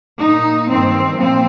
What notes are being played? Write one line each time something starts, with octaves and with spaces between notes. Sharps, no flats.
A#2 A#3 D#4
G2 D#3 A#3 C4
A#2 F3 A#3 C4